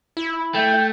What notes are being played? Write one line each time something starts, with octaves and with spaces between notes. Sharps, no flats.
E4
A3 G5